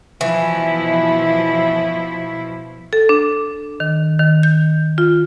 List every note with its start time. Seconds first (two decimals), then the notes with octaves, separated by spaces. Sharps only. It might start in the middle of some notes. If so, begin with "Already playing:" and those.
0.21 B2 E3 F3 E4
2.93 A4
3.09 D4
3.80 D#3
4.19 D#3
4.43 G6
4.98 F4